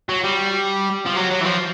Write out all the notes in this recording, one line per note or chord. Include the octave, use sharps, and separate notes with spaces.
F#3
G3
F3
F#3
F#3
E3
F3